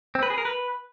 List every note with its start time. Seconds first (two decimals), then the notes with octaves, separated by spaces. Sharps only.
0.15 C4
0.23 B4
0.30 G#4
0.38 A#4
0.45 B4